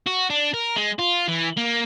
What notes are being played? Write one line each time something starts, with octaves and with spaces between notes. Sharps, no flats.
F#4
D4
A#4
G#3
F4
E3
A#3